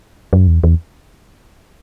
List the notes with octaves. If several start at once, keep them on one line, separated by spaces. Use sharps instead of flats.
F#2
E2
E2